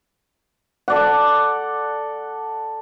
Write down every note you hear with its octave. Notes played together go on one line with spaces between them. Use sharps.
A4 D5 F#5